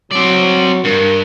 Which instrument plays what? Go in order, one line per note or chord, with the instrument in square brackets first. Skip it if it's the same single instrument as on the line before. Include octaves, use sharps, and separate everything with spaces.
[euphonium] F#3 [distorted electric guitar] C4 D5
[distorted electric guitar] G2 [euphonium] A#4